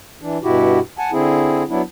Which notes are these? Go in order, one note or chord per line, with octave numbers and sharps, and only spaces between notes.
E3 D4
G2 B2 E4 F#4 G4
F#5 G#5 A5
D3 C4 E4 G#4
F#3 B3 D4 E4